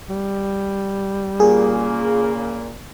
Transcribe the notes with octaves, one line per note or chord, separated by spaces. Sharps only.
G3
A#2 C#3 A#3 G#4